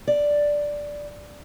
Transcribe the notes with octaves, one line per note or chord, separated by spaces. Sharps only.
D5